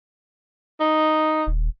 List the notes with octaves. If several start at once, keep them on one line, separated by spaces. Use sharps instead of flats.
D#4
D#1